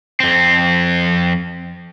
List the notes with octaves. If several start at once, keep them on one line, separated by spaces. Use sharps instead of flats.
F2 C4